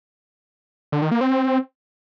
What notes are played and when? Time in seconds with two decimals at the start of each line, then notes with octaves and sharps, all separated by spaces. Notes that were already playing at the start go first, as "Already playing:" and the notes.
0.92 D3
1.02 D#3
1.11 A#3
1.21 C4